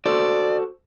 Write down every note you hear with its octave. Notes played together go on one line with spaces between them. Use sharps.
F#4 A4 C5 D5